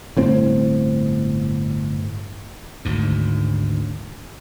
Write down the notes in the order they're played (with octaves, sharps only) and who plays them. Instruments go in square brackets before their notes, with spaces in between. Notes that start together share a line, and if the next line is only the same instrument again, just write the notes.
[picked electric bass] G1 A2 C4
[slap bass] G#1 D2 G#2